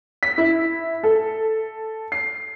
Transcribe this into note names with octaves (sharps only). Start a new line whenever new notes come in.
B6
E4
A4
C7